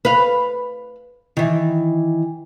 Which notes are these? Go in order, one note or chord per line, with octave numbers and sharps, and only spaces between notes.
B4 F5
D#3 E3